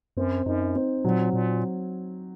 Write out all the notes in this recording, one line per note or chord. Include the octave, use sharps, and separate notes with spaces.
F#2 C4
F#2 D#4
C4
A#2 F#3
A#2